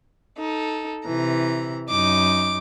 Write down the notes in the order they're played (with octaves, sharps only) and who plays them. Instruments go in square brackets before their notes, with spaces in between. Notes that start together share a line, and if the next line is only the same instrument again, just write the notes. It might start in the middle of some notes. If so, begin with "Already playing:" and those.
[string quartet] D#4 A4
C3 E3 A#5
[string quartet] F#2 D#4 [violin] D6